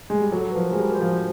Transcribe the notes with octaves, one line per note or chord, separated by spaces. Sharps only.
G#3
G3
F#3 A4
F3 B4
A#4
G#3
G3
C5
F3